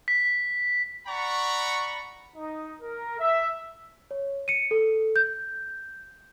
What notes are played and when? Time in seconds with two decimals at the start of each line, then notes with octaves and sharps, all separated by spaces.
0.08 B6
1.06 D5 F#5 A#5 B5 C#6
2.36 D#4
2.81 A#4
3.19 E5
4.11 C#5
4.48 C#7 D#7
4.71 A4
5.16 G6